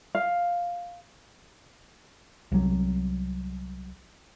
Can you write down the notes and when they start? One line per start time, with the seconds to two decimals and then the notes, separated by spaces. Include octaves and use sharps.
0.15 F5
2.52 C2 F#3